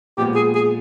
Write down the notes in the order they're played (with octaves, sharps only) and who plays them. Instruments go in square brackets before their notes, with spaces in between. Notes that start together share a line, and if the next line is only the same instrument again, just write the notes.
[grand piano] A#2 F3 G#3 B3 [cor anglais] G4
[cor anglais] G#4
G#4